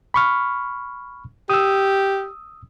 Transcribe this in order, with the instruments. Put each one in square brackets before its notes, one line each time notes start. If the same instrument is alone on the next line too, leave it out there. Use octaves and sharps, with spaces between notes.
[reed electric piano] B5 C#6 F6
[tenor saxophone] G4 [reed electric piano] D#6 E6